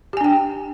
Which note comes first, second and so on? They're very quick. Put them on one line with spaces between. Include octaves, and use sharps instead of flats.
G4 G#5 D4 G5